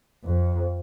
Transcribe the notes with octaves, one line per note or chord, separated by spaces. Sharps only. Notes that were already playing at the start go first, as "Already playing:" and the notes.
F2